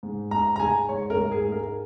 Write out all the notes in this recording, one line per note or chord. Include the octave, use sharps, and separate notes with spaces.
G#2
G#2 A#5
A#5
G#3 G#5
G#2 C#5
A#4
G#2
G#4
G#3
A#4